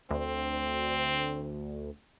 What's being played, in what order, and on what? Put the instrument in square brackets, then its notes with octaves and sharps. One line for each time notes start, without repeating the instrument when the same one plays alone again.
[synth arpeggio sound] D2 [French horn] C4